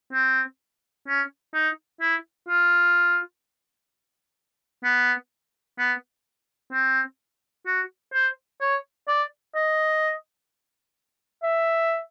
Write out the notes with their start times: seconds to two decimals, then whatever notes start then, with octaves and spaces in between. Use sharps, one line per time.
0.13 C4
1.08 C#4
1.54 D#4
2.01 E4
2.48 F4
4.84 B3
5.79 B3
6.72 C4
7.66 F#4
8.14 C5
8.61 C#5
9.08 D5
9.55 D#5
11.43 E5